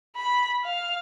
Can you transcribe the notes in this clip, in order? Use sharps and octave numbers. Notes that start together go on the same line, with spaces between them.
B5
F5